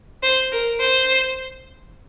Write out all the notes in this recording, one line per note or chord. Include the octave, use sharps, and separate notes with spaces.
C5
A#4
C5